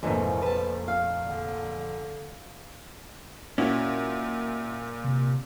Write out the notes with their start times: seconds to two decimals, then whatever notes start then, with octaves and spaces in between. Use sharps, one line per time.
0.03 F1 A#1 G#2 E3 F3 A#3
0.42 B4 A5
0.88 F5
1.28 D3
3.58 A#2 C#4 E4 F#4
5.04 C3